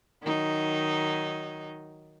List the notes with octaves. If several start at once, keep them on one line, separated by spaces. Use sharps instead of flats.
D#3 F#3 D#4